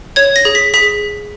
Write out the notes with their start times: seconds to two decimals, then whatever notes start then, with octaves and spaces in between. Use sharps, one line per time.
0.16 C#5 G#6
0.36 A#6
0.45 G#4
0.55 B6
0.74 G#4 B6